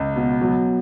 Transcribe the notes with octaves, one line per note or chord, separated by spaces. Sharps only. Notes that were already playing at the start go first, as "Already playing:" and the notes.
Already playing: C#2
B2
F#3